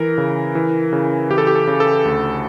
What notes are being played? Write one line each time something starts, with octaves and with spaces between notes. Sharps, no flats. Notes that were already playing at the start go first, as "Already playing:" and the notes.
Already playing: E3 A#4
C#3
E3
C#3
E3 G4
A4
G4
A4
C#3
A4
D2